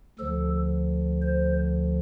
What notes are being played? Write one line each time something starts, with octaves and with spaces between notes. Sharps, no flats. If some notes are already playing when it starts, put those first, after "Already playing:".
D2 D3 F3 A4
C5